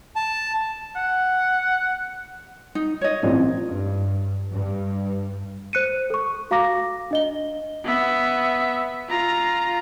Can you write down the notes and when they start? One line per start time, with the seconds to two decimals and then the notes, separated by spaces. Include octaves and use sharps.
0.16 A5
0.96 F#5
2.75 D#4
3.01 C#5 D#5
3.22 A1 A#2 C4
3.64 G2
4.52 G2
5.73 C5 F#6 C#7 D#7
6.10 A4 C#6
6.51 F#4 F5 A#5 D6 A#6
7.11 D4 D#5 G7
7.84 B3 E5
9.09 F4 A#5